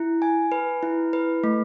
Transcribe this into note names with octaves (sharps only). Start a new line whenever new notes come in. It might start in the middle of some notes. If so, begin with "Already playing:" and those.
Already playing: E4
G#5
B4
E4
B4
A3